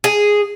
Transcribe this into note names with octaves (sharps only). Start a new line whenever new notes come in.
G#4